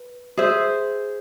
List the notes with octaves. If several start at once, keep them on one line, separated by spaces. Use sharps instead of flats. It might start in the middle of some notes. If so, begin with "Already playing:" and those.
Already playing: B4
G#4 C5 E5